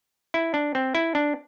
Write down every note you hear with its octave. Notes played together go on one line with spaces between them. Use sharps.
E4
D4
C4
E4
D4